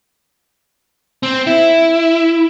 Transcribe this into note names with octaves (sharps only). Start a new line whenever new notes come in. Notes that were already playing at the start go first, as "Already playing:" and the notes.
C4
E4